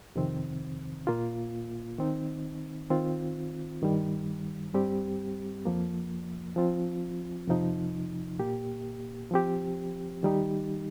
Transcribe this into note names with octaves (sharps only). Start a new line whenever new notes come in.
F2 C3 D#3 C4
A#2 A#3 F4
D#3 C4 D#4
D#3 C4 F4
G2 D#3 G3
G2 G3 C4 G4
F2 F3 A#3
F3 C4 F4
F2 C3 F3 D#4
A#2 A#3 G4
F3 C4 G4
D#3 G3 D#4 G4